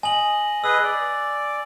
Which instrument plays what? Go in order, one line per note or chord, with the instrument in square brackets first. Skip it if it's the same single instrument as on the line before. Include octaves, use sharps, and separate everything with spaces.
[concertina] D#5 [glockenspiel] G#5 F#7
[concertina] G#4 B4 D#5 [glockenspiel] E6
[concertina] D5